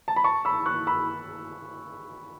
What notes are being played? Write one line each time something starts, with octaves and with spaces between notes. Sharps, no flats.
A5
B5
A5 C#6
B5 E6
C#6 F#6
B5 E6